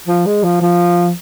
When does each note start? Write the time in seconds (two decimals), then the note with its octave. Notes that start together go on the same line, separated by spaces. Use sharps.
0.08 F3
0.26 G#3
0.44 F3
0.61 F3